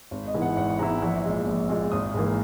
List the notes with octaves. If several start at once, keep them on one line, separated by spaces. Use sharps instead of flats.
G#1
D#5
G#2 E3 B3 E4
F#5
G#1 F#5
G#2 E3 B3 E4 A#5
A#1 E6
A#2 G#3
A#1
A#2 G#3
G#1 D#6
G#2 E3 A#3